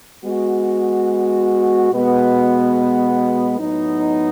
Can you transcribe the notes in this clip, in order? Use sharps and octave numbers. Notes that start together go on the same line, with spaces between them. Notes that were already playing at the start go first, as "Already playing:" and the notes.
G#3 B3 F#4
B2 G#3 B3 F#4
A2 F#3 B3 D#4